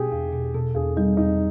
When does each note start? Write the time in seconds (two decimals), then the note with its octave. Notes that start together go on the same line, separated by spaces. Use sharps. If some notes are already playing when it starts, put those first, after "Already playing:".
Already playing: B2 G4 G#4
0.12 E2
0.33 B2
0.54 B2 A4
0.75 E2 G#4
0.97 G3 D#4
1.17 E2 D#4